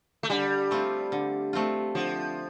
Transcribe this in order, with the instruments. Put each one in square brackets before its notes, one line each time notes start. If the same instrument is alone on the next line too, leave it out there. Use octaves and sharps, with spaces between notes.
[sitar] A3
[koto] D3 [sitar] G3
[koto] A3 C4 F4
D3
A3 C4 F4
[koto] D3 [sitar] F3